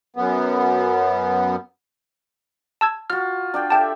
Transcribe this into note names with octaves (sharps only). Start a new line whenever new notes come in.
F#2 B3
A5 E6 G#6
F4 F#4 F6
D4 D5 G5
G4 A4 E5 G5 A5